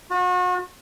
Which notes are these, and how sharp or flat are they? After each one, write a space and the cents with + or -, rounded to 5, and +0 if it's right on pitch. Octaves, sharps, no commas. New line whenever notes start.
F#4 -35